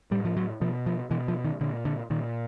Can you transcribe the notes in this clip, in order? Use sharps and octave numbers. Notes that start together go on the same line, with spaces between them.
A2 G3
F3
F#3
B2 F3
F3
B2 E3
F3
D#3
A#2 D3
D3
A#2 D#3